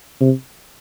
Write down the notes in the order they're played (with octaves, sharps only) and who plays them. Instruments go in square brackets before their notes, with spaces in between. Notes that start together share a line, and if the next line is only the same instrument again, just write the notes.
[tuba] C3